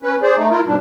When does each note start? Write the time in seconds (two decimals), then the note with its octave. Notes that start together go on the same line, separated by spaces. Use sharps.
0.03 C#4 B4
0.22 G#4 C5 D5
0.36 A3 D#4
0.50 E4 F4 A#4
0.66 G#2 B2 G3 D4